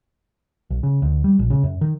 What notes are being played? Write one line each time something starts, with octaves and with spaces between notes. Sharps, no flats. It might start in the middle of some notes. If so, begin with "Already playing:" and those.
B1
C#3
D2
G3
A#1
C#3
F#2
D#3